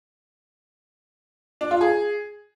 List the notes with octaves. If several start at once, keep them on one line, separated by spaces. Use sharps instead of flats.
D4
F4
G#4